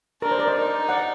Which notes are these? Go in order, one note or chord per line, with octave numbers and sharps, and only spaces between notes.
D4 A#4
C5
A#4 D5
C5 D#5
D#4
D5 F#5